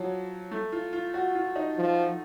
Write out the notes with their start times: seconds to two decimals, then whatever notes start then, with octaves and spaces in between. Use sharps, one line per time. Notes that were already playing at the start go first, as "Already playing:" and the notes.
Already playing: F3 F#3
0.51 A3
0.72 F4
0.93 F4
1.14 F#4
1.35 F4
1.56 D#4
1.77 F3